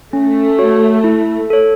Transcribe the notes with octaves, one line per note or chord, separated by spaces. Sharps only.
A3 C#4
F#4 C#5
E4
A4 C#5